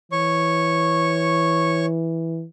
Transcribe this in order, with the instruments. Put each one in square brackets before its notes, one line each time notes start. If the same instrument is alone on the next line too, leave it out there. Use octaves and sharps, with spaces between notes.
[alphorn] E3 [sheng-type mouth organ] C#5 C#6